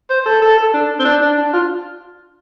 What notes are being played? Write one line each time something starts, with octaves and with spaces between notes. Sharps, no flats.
C5
A4
A4
A4
D4
C4
D4
D4
D4
F4